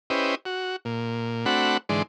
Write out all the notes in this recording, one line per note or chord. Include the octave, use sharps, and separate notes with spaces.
C#4 E4 G4 B4 C5 D#5
F#4
A#2
A3 C4 D4 F#4 F#5 B5
G#2 D3 E3 G#3 D5 C6